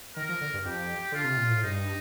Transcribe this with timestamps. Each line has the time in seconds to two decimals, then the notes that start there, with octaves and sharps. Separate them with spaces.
0.16 D#3 A#4
0.29 F3
0.41 D3
0.54 G2
0.65 F2 G4
1.12 D3 F4
1.24 C3
1.37 A#2
1.50 A2
1.63 G2 D#4